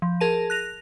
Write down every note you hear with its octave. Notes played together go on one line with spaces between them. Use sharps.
F3
G#4 A#4 A5 D#7
F#6 A#6 F7